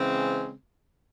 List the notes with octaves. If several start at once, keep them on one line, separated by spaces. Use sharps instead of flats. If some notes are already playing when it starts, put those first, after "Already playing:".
Already playing: C#3 E3 G#3 C4